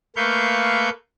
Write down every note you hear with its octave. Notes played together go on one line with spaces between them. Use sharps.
A3 A#3 B4 F5 C#6 G6